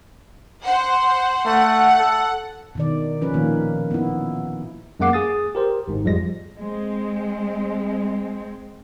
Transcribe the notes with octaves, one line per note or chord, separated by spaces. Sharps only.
C5 F#5
A3 F#5
A4
B2 D#3 D5
F3 C#4 B4
A#2 D#3 A#3
B3 E4
F#2 G#3 A#3 F#5 D6 C7
G#4 D#6 A6
G4 A#4 C5
G#1 G#2
F2 F3 G3 G#3 A#6
G#3 C4